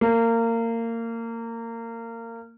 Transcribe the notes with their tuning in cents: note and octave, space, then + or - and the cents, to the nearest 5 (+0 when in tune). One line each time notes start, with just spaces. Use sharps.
A#3 -25